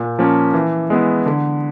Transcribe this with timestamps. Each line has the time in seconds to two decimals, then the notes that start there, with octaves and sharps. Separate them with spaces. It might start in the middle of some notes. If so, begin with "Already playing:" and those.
Already playing: A#2
0.19 F3 A#3 C#4
0.54 E3
0.90 G#3 B3 E4
1.26 D3